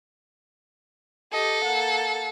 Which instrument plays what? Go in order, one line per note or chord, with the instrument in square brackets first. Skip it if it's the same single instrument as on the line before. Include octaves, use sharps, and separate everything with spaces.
[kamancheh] G4 D#5 [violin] A4
[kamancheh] A#3 F#5